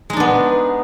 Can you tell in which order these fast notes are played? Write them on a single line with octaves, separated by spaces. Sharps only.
G#3 D#4 D4 B3